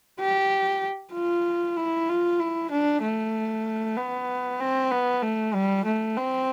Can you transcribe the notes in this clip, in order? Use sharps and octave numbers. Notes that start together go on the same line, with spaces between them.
G4
F4
E4
F4
E4
D4
A3
B3
C4
B3
A3
G3
A3
C4